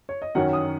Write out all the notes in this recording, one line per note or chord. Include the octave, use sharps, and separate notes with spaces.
C#5
D#5
F#2 D#3 F#3 C#4 F#5
D#6